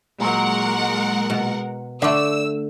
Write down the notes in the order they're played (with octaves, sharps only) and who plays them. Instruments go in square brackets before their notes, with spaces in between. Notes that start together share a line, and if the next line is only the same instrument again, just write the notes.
[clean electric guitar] A#2 F#3 [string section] G#3 A#4 F#5
[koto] B2
[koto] D3 A3 [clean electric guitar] D5 [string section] E6